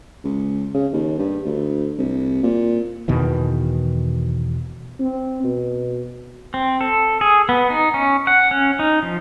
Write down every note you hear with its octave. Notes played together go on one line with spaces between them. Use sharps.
C#2
C#3
D#2
G2
D2
C2
A#2
E2 B2 D#3 E3
C4
B2
C4
A4
G#4
B3
D#4
C#4
F#5
C#4
D#4
F3